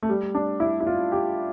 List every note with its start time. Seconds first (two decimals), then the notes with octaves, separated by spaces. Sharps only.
0.03 A3
0.09 G3
0.35 D4
0.60 E4
0.80 E4
0.87 F4
1.12 G4